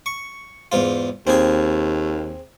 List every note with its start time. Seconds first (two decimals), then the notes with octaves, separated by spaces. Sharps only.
0.06 C#6
0.72 E2 G#2 F4
1.27 D#2 C4 G#4